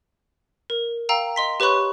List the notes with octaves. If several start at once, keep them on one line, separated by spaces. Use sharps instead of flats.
A#4
F5 G5 A#5 E6
D#5 C6 B6
G4 B4 C#5 B5 C#6 F#6